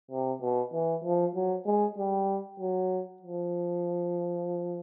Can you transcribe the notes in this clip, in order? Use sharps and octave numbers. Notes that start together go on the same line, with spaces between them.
C3
B2
E3
F3
F#3
G#3
G3
F#3
F3